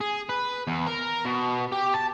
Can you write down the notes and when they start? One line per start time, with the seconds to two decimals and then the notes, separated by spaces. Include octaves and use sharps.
0.01 G#4
0.29 B4
0.68 E2
0.87 A#4
1.25 B2
1.72 G4
1.94 A5